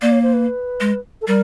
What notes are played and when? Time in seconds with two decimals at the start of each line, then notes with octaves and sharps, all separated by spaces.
0.02 A#3 D5
0.12 C#5
0.23 C5
0.34 B4
0.80 G#3
1.22 A4
1.27 G3 A#4